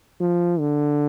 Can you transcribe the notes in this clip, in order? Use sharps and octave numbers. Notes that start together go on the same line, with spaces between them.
F3
D3